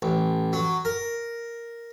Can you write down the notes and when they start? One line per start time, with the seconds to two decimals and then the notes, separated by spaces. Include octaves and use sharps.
0.02 A1
0.53 F#3
0.85 A#4